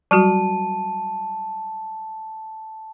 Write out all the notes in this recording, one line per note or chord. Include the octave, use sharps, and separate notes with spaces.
F#3 G3 F#4 A5